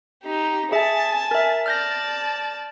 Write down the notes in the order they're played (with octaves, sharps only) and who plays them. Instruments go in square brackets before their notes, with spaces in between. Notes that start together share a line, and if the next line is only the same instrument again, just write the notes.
[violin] D#4 G4
[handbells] G#4 E5 [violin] G#5 A5
[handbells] A#4 E5
[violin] D5 A5 [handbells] F6 G6 A#6